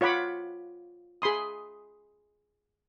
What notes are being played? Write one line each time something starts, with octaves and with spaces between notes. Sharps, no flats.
F4 C#5 F#5 B5 D6
G#4 B5 C6 D#6